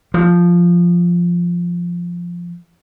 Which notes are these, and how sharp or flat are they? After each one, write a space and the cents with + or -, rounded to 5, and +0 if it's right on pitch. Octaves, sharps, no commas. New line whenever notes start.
F3 -5